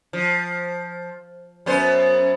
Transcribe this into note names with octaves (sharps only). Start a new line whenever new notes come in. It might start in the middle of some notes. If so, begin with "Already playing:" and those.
F3
F#2 B3 C5